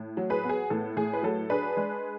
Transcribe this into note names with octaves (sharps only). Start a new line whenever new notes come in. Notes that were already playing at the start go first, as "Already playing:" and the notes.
Already playing: A2
F#3
G#4 B4
B3
G#4
A2 A4
A2 G#4
B4
F#3 A4
D4 G#4 B4
G#3